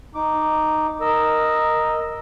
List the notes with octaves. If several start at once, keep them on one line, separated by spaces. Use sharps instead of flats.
D#4 D6
A#4 D#5 E6